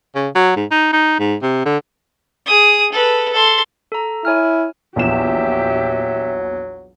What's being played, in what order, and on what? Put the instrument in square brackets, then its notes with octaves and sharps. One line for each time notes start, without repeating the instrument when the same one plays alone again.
[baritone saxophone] C#3
F#3
G#2
D#4
D#4
G#2
C3
D3
[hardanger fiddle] G#4 D#6
A4 B4
A4 C6
[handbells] A4 A#5
[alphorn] E4 [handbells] C#5 G#5 F6
[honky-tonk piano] A#1 E2 E7 [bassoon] F#3 [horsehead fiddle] G4 E5